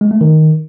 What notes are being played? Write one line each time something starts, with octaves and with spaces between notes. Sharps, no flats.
G#3
A3
D#3